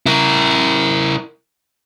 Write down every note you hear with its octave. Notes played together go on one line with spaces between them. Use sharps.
E4 A#4